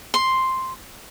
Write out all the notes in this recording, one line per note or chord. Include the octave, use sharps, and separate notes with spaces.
C6